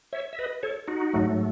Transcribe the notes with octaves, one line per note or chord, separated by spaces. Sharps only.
C#5 E5
E5
B4 D#5
A4 C#5
D#4 F#4
G#2 F#3 A3